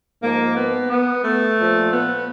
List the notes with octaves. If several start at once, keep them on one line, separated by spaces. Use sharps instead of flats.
G#2 F3 A#3
B3
B3
A3
A#2 F3
B3